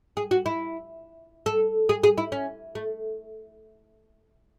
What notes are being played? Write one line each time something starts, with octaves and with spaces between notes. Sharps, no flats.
G#4
F#4
E4
A4
G#4
G#4
E4
C#4
A3